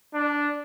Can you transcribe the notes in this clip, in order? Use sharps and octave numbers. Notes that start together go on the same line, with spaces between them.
D4